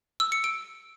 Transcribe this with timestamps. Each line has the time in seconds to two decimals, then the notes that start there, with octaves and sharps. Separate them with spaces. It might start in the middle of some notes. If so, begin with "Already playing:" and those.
0.20 E6
0.32 C#7
0.44 D7